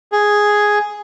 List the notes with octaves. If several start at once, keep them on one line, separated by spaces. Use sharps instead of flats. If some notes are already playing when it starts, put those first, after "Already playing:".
G#4